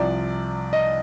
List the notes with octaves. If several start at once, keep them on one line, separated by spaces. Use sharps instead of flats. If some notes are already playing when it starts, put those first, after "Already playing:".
Already playing: C2 C3 F3 D5
D#5